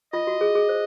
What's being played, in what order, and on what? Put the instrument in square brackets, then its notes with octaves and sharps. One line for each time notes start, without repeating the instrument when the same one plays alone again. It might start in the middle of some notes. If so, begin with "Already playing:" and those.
[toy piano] F4 [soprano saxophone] D#5
[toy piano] F#4
G#4
G#4
C5